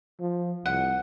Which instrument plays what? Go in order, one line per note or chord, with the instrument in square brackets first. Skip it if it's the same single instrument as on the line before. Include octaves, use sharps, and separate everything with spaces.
[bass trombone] F3
[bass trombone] C2 [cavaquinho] F#5